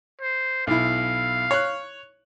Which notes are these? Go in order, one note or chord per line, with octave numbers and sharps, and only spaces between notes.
C5
B1 E4 F5
C#5 F#6